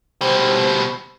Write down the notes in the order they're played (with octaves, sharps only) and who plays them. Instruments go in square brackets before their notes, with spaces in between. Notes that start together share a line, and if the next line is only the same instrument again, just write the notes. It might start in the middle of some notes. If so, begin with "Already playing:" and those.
[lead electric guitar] B2 G3 [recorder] C5